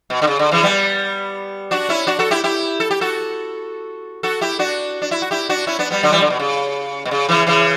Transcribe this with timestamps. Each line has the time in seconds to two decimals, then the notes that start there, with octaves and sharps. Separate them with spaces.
0.10 B2
0.22 D3
0.27 C#3
0.39 D3
0.51 C#3 E3
0.63 G3 B3
1.71 D4 F#4
1.89 C#4 E4
2.07 D4 F#4
2.19 F#4 A4
2.31 E4 G4
2.44 E4 G4
2.80 A4
2.91 G4
3.01 F#4 A4
4.23 F#4 A4
4.41 E4 G4
4.59 D4 F#4
5.02 D4
5.11 E4
5.22 F#4
5.31 E4 G4
5.49 D4 F#4
5.67 C#4 E4
5.79 B3 D4
5.91 G3 B3
6.03 D3 F#3
6.12 E3 G3
6.21 D3
6.30 B2
6.40 C#3
7.05 B2
7.11 C#3
7.29 C#3 E3
7.47 C#3 E3